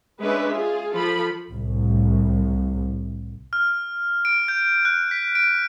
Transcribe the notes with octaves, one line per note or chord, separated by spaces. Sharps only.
G#3 C#4 D4 B4 E5
F4 G#4
F3 A4 B5
C2 A2
F6
D7
G6
F#6
B6
D7